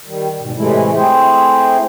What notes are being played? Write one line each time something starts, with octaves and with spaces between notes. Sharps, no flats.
D#3 G3
G#2 B2
A2 C3 E3 G#3 A3 E4
A3 C4 E4 G#4 C5